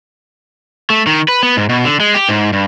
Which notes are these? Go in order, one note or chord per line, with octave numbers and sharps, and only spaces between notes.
A3
D#3
B4
B3
G#2
B2
D3
G#3
G4
G#2
G2